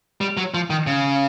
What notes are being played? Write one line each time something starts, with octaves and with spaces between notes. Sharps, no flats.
G3
F#3
F3
D#3
C#3